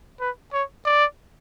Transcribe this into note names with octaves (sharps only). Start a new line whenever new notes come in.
B4
C#5
D5